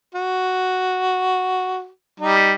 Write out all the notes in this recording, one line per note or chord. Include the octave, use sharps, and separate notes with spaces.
F#4
G3 D#4